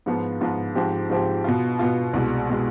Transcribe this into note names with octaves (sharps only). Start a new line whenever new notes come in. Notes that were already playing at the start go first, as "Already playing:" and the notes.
G#2 F3 B3 F4
G#2 F3 B3 F4
G#2 F3 C4 G4
G#2 F3 C4 G4
B2 B3 F4
B2 B3 F4
C2 B2 G#3
B2 G#3